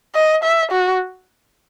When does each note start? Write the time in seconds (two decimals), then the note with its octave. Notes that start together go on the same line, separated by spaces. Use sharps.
0.15 D#5
0.44 E5
0.72 F#4